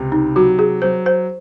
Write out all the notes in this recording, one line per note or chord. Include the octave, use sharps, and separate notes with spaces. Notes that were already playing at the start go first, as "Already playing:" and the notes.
Already playing: C#2 C3
D#4
F#3 F#4
G#4
F#3 C5
C5